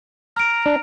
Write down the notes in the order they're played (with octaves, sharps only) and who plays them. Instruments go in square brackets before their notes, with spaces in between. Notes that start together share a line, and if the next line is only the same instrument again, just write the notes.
[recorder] A#5 [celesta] F6 D7
[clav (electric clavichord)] D4